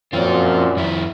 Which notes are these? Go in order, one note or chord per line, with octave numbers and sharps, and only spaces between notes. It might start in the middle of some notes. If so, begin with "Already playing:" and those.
F#2 A#2 F3 C4 F4
F2 E4